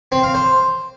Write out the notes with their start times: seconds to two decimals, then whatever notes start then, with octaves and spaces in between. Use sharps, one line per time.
0.12 C4
0.23 F5
0.34 C5